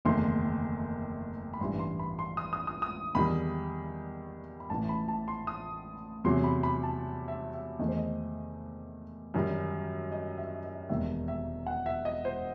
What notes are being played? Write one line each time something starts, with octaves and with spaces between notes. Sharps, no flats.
F#1 E2 D#3 A3 C6
B5
A1 G2 E3 G3 C6
C6
B5
C6
D#6
D#6
D#6
D#6
E2 D#3 G3 B5
B5
A1 A2 E3 A5
B5
A5
C6
D#6
E2 C3 F#3 C6
B5
B5
A5
E5
E5
E2 D#3 A3 D#5
C5
D#5
F#2 D#3 G3
D#5
E5
D#5
E1 D#2 D#3 G3 E5
E5
F#5
E5
D#5
C5